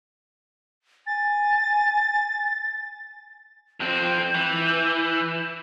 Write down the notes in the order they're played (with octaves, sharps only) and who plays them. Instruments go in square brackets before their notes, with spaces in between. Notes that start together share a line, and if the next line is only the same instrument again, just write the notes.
[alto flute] G#5 [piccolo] A6
[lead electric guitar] F2 C4 [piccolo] G6
[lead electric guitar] E3